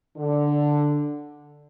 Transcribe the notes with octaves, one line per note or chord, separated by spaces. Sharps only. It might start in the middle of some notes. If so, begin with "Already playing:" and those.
D3